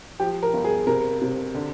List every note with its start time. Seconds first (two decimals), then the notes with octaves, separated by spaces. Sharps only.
0.20 F3 G4
0.43 A#4
0.53 G1
0.64 G#4
0.87 C3 A#4
1.22 C3
1.55 D3